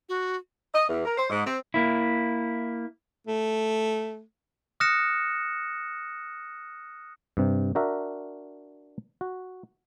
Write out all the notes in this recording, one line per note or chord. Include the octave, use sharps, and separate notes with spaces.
F#4
D#5
E2
A#4
C5
G#2
C4
A#3 E4
A3
D#6 F6 F#6 A#6 C#7 E7
G2 C3
D4 F#4 A#4 E5
F#4